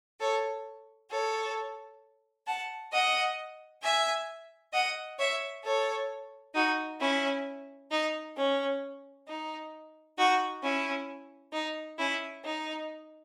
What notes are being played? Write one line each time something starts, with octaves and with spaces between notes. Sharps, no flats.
A4 C#5
A4 C#5
F#5 A5
D#5 F#5
E5 G#5
D#5 F#5
C#5 E5
A4 C#5
D#4 F#4
C#4 E4
D#4
C#4
D#4
D#4 F#4
C#4 E4
D#4
C#4 E4
D#4